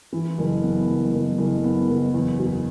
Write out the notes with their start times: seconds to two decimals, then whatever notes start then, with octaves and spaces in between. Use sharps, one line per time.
0.13 E3
0.38 F#1
0.63 B3
0.89 F#1
1.13 F#1
1.38 F#1
1.64 B3
1.89 F#1
2.14 E2
2.39 F#3